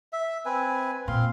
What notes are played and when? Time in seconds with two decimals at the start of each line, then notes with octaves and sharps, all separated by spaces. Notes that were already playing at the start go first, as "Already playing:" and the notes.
0.13 E5
0.46 C4 B4 G#5
1.08 A#2 C4 F5 C6